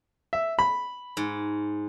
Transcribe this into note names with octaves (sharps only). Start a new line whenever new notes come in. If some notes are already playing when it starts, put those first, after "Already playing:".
E5
B5
G#2